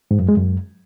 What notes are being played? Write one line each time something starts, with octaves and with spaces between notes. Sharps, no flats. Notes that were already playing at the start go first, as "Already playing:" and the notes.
G#2
F#2
G#3
F#2